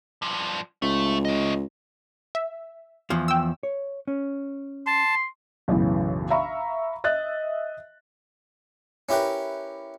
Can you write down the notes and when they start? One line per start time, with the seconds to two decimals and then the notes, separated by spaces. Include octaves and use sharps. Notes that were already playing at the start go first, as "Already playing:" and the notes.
0.22 G2 F3
0.82 C#2 A3
1.25 A3 D#5
2.35 E5
3.10 E2 F3
3.28 G5 E6
3.63 C#5
4.08 C#4
4.87 A5 C6
5.68 B1 F#2 A2 C#3 E3
6.30 E5 F5 A#5 B5 C#6
7.04 D#5 E5 F#6 A6
9.09 C#4 E4 G4 A#4 B4